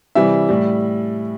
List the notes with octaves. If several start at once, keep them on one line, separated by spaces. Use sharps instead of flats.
C3 E3 G3 E5
A2 G3